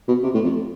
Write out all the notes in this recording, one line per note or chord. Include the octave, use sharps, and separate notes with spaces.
B2
C3
A2
F2